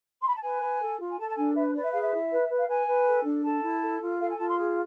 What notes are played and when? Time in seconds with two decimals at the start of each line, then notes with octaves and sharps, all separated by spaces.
0.20 C6
0.27 B5
0.34 A5
0.41 B4 G#5
0.61 B4
0.80 A4
0.99 F4
1.10 G#5
1.17 A4 A5
1.27 A5
1.35 D4 G#5
1.54 B4 E5
1.73 B4 D5
1.83 E5
1.91 G#4 F5
2.00 E5
2.11 E4
2.30 B4
2.49 B4
2.59 F5
2.68 B4 G#5
2.87 B4
3.06 A4
3.24 D4
3.43 A4 A5
3.62 E4
3.81 A4
4.00 F4
4.18 A4 F5
4.28 G#5
4.37 F4 A5
4.47 C6
4.56 G#4